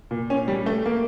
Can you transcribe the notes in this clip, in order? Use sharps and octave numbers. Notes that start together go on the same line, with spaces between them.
A#2
C#4
G3
A3
A#3